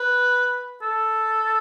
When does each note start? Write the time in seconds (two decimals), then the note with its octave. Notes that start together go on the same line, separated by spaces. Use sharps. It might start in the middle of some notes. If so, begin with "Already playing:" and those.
Already playing: B4
0.82 A4